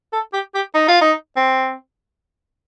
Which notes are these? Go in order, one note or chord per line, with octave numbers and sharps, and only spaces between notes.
A4
G4
G4
D#4
F4
D#4
C4